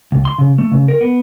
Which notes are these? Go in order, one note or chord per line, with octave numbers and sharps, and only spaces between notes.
C#2
C6
C#3
A3
C#3
A#4
B3